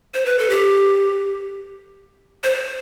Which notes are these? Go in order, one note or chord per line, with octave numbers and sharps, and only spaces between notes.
C5
B4
A4
G4
C5